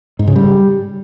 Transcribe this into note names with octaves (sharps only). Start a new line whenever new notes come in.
G#2
C#3
G3